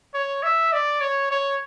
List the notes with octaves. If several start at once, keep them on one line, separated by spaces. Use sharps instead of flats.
C#5
E5
D5
C#5
C#5